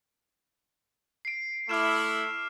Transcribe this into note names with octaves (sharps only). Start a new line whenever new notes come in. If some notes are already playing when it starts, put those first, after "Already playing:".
C7 D7
A3 E4 D6 F6 E7